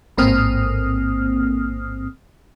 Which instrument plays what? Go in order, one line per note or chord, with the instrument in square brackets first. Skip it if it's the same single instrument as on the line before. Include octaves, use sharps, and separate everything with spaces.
[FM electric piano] A1 G#2 A#3 C4 D#6 F6